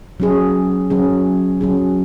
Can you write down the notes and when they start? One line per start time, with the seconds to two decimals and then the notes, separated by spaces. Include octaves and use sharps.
0.20 F#3 C#4 G#4
0.90 F#3 C#4 G#4
1.61 F#3 C#4 G#4